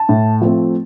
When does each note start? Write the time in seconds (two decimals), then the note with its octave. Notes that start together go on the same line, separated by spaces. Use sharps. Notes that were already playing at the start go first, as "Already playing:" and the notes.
Already playing: A5
0.09 A2
0.42 F3 A3 C4